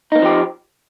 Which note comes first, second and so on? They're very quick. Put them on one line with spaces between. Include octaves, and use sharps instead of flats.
D#4 A#3 C4 F3 G4